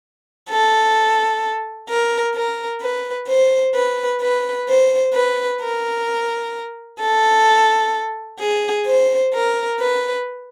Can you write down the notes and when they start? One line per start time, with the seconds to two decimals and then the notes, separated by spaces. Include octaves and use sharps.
0.50 A4
1.90 A#4
2.35 A#4
2.82 B4
3.28 C5
3.76 B4
4.22 B4
4.68 C5
5.15 B4
5.61 A#4
7.00 A4
8.40 G#4
8.86 C5
9.34 A#4
9.80 B4